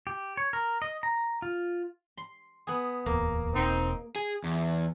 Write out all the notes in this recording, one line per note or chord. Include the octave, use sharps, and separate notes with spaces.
G4
C#5
A#4
D#5
A#5
F4
C6
B3 G#4
D1 E2 A#3
E1 C4 D#4
G#4
E2